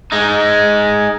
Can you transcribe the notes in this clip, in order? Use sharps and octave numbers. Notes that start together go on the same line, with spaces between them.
G#3 D#4